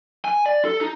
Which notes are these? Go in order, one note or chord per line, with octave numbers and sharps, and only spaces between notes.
G#5
D5
A4
D#4